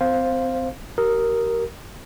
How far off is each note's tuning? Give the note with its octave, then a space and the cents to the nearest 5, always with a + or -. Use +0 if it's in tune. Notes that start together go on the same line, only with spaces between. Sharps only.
C4 -30 C5 +5 F5 +0
G4 -35 A#4 +0 D#6 +0